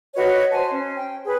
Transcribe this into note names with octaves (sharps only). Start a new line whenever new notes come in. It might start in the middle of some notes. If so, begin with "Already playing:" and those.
F#4 B4 C#5 D#5
C5 G#5 A5
C#4
G5
G#4 B4